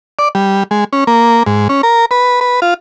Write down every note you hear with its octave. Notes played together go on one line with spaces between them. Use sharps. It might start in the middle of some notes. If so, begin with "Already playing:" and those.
D5
G3
G#3
C#4
A#3
G#2
C#4
A#4
B4
B4
F4